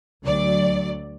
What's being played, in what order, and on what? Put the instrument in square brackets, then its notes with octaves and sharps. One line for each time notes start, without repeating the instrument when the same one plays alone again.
[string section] D2 F#3 D5